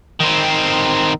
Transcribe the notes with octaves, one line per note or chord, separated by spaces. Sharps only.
D#3 C4